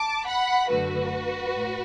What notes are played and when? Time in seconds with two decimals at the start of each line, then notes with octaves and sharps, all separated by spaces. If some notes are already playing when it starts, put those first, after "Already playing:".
Already playing: A5 D6
0.26 F#5 B5
0.68 F#2 D3 A3 F#4 B4
1.54 A2